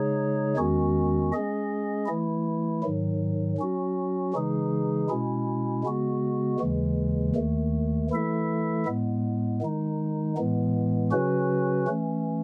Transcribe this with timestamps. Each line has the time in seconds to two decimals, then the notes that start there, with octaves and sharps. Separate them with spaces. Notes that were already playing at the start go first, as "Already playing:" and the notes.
Already playing: C#3 G#3 D#4 G#4 C#5
0.57 E2 D#3 G#3 C#4 F#4
1.32 G#3 C#4 G#4 D#5
2.07 E3 A3 E4
2.83 G#2 D#3 F#3
3.57 F#3 C#4 F#4
4.34 C#3 E3 G#3 D#4 G#4
5.09 B2 G#3 C#4 E4
5.84 C#3 G#3 B3 F#4
6.59 D#2 C#3 E3 G#3
7.36 D#2 D#3 A3
8.10 E3 A3 E4 A4 E5
8.86 A2 G#3 B3
9.61 D#3 G#3 D#4
10.37 A2 E3 G#3 B3
11.11 C#3 F#3 C#4 F#4 B4
11.88 E3 A3 C#4